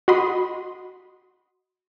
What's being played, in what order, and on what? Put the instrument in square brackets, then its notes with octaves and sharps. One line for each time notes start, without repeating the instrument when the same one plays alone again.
[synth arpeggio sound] F#4 D#5 F#5 B5 C6 D#6